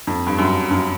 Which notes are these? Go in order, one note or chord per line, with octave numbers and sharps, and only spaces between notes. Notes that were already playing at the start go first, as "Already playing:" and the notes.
F2
G2
F#2
F#2